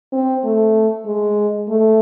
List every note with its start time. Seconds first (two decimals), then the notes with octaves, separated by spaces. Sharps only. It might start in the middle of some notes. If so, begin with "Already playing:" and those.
0.12 C4
0.44 A3
1.06 G#3
1.69 A3